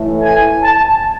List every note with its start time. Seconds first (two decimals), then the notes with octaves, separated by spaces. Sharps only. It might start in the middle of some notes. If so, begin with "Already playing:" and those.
Already playing: A2 E3 A3
0.23 G#5
0.61 A5